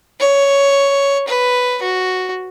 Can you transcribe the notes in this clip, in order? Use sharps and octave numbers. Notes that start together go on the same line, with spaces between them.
C#5
B4
F#4